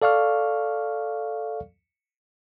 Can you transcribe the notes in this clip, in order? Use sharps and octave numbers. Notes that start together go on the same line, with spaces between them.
A4 D5 F5 C#6 F6